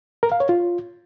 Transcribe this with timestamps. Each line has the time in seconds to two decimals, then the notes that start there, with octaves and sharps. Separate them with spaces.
0.23 A#4
0.32 F5
0.40 C#5
0.49 F4